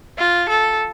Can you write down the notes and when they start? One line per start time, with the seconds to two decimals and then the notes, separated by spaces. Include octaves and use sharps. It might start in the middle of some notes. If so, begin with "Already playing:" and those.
0.18 F4
0.49 A4